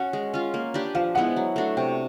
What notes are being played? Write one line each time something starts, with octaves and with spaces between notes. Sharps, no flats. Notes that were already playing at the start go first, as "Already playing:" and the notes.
Already playing: C#4 F#4 F#5
G#3
C#4 F4
A#3
D4 G4 B4
F3 F5
G#3 B3 E4 F#5
F#3
A3 D4 F#4
C3 G5